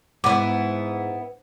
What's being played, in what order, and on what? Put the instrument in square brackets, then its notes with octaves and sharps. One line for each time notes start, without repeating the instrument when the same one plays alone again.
[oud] G#2 [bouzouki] B3 E4 [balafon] D6